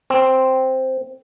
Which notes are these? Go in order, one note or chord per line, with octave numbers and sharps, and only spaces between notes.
C4